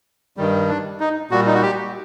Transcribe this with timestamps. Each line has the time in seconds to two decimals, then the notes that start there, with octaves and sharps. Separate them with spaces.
0.37 G2 D#3 G3
0.69 D4
1.00 D#4
1.31 A#2 G3 F#4
1.47 D#4
1.54 F#4
1.62 G4